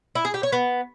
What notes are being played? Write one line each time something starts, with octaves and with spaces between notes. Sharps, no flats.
E4
G#4
G4
C#5
B3